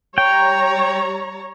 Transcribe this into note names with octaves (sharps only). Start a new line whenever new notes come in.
G3 C#5 G5 A#5